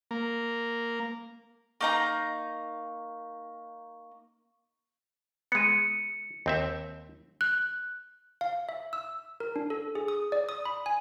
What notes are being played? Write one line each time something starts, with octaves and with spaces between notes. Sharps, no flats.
A#3
A#3 D#4 A#5 C#6
G#3 B3 C#7 D#7
D#2 C4 E5
F#6
F5
E5
E6
A#4
D4
A4
G#4
D#6
D5
D#6
B5
G#5